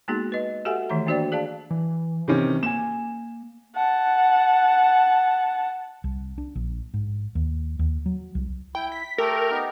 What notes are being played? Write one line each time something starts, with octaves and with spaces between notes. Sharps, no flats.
G#3 A#3 B3 D#4 F#4 G#4
B4 D#5
F#4 G4 A4 E5 F#5 G#5
D#3 E3 A3 E5 A#5
A#3 D4 F#4 C5 D5 G5
G#4 D5 F5 A5
E3
C3 D#3 C#4
A#3 G#5 E7
F#5 A5
C2
D4
A#1
G#2
D#2
D#2
F#3
C2
E4 G5
B6
A3 G4 A4 A#4
B3 D#4 G4